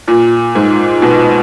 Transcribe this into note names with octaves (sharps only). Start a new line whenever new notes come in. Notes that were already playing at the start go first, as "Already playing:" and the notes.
A#2
G#2
B2